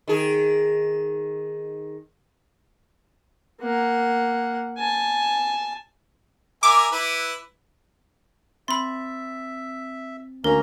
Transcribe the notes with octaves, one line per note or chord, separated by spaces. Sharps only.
D#3 G#4
A#3 F#5
G#5 A5
A#4 E5 G#5 D6
E4 B4
C4 E5 B5 C6 A6
D2 A#3 C#4 A#4 A#5